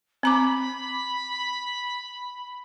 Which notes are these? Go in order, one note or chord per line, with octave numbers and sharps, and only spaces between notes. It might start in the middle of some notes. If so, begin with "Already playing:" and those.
C4 A#5 B5 D6